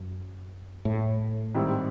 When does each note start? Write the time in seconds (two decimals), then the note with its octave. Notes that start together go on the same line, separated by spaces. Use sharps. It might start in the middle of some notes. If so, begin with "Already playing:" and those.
Already playing: F#2
0.85 A2
1.55 G#2 D#3 G3 C4 E4